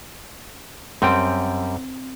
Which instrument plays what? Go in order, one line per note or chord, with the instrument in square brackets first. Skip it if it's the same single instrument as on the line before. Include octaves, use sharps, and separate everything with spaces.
[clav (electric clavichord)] F#2 G3 G5 [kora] C4